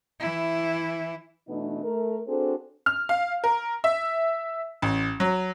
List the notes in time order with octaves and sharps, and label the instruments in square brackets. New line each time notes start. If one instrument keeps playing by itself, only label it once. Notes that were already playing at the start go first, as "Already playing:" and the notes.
[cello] E3 E4
[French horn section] B2 E3 A3 B3 D4 D#4
A3 A#4
C4 D4 F#4 G#4 A4 C5
[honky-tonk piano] F6
F5
A#4
E5
A1
F#3